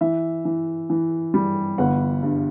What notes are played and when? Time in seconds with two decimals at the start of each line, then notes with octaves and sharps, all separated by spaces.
0.01 E3 E5
0.45 E3
0.90 E3
1.34 G3
1.78 G1 F#5
2.23 G2